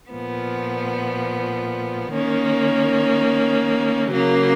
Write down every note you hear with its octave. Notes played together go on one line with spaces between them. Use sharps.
A#2 F3 B3
D#3 A#3 C#4
C#3 F#3 A#3